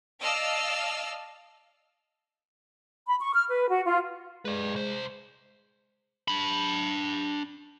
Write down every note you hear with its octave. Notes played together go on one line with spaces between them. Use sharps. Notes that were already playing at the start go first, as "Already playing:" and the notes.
D5 D#5 F5 A5 E6 F6
B5
C#6
F6
B4
F#4
F4
G#3 B4 D5
C2 C5
D4 B5